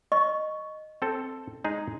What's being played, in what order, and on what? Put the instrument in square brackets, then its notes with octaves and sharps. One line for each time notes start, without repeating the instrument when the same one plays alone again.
[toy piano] D#5 C#6
[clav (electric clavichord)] C4 A4
G#3 D#4 G#4